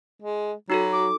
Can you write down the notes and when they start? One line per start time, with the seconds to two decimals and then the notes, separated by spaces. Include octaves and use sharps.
0.22 G#3
0.70 F#3 D#4 F#4 A4
0.92 D6